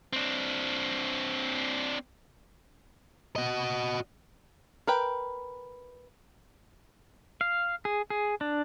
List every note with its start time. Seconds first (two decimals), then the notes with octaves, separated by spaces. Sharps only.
0.13 C4 D4
3.36 F#4 D#5
4.87 A#4 B4 G5
7.41 F5
7.85 G#4
8.10 G#4
8.41 D4